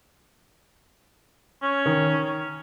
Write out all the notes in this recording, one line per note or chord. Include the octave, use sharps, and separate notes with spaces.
C#4
D#3